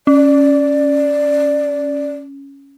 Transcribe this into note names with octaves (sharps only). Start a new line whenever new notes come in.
C#4 D5